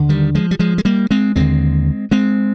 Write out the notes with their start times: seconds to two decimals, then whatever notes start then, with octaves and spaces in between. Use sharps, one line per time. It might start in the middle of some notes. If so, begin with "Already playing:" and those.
Already playing: D#2 D3
0.09 D#3 G3
0.35 F3 G#3
0.51 G3
0.59 F3 G#3
0.78 G#3
0.85 G3 A#3
1.11 G#3 C4
1.36 D#2 D3 G#3 C4
2.11 G#3 C4